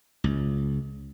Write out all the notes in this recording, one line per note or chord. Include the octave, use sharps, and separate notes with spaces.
C#2